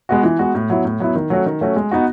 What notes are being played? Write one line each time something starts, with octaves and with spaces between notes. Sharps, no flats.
G#3 B3 F#4
E3
G#3 B3 F#4
A2
F#3 B3 E4
A2
F#3 B3 E4
D#3
F#3 A3 C#4 F#4
D#3
F#3 A3 C#4 F#4
G#3
B3 D#4 F#4